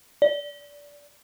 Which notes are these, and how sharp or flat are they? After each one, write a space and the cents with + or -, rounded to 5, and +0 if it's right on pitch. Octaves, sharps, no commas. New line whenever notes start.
D5 -20